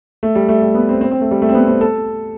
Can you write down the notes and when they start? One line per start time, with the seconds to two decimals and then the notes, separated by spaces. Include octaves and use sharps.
0.23 A3
0.35 G3
0.49 A3
0.62 G3
0.75 B3
0.89 C4
1.01 C4
1.11 C4
1.21 A3
1.31 G3
1.42 A3
1.49 C4
1.54 B3
1.67 C4
1.81 A4